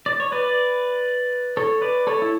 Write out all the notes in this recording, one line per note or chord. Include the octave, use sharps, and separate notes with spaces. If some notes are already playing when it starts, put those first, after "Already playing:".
D5
C#5
B4 D5
A4 C#5
B4 D5
A4 C#5
E4